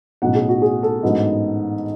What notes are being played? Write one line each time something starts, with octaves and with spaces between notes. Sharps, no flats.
B1 A2 F#3 C#4 F#5
G#4
F#4
G#4
A4
A1 G#2 F#3 B3 D4